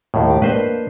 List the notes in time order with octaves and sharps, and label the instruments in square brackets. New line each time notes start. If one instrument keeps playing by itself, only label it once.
[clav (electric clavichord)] D#2 A2
[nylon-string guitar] G4
[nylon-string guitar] A#3 D4 [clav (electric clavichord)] B4 C5 D#5